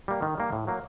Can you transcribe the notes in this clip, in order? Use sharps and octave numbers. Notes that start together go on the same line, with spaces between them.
G3 A#3
D#3
G3 A#3
A2
F#3 A#3